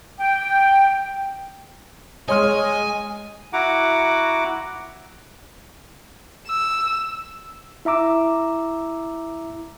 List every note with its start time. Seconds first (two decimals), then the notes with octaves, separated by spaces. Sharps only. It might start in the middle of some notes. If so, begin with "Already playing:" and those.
0.18 G5
2.29 G#3 C#5 D#5 G#5 C6 F6
3.53 E4 F#4 F#5 A#5 D6
6.47 E6
7.85 E4 E5 A#5 D6 E6